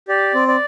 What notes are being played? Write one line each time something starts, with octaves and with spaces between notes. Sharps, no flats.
G4 D5
C4
D5